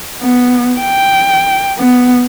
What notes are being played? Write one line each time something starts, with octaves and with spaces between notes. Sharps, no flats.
B3
G5
B3